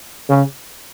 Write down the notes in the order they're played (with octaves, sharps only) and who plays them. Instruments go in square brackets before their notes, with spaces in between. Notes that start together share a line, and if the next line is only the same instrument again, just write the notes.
[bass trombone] C#3